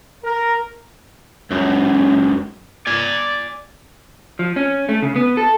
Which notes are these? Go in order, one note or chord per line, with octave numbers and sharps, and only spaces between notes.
A#4
C#2 F#2
D5 G#5
F3
C#4
A3
C#3
B3
A4